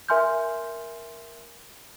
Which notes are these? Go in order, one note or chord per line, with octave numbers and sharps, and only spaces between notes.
A#4 E5 G#5 C6 F6 G6